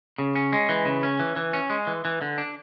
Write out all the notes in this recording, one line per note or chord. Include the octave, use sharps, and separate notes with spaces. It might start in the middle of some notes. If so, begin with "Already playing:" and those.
C#3
C#4
G#3
E3
C#3
C#4
E3
E3
C#4
G#3
E3
E3
D3
D4